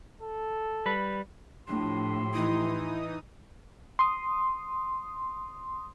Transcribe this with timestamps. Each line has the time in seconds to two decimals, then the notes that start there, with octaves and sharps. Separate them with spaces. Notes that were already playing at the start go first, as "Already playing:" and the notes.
0.21 A4
0.86 G3 B4
1.68 A2 F3 D4 G4 C6
2.33 E3 D#4 E4 D#6
3.99 C6 D#6